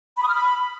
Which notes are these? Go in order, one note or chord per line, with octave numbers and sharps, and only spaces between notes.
B5
D#6
F6
B5